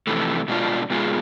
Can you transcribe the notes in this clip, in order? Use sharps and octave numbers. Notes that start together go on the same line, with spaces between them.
F2 C3 E3 A3
B2 G#3 D4 F4
B2 G#3 B3 F4 G#4